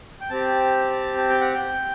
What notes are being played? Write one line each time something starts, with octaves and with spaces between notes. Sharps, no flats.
G5
C4 G4 A5
A5
G5
F#5
G5